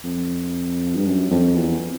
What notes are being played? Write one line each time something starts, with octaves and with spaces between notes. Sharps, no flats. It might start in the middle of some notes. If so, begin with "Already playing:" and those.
F2
G2
F#2
F2
E2